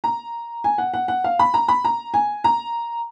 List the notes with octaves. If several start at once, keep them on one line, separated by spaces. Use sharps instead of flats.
A#5
G#5
F#5
F#5
F#5
F5
B5
A#5
B5
A#5
G#5
A#5